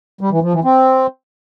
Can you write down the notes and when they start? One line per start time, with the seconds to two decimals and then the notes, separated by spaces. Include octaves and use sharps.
0.21 G3
0.32 E3
0.43 F3
0.53 E3
0.64 C4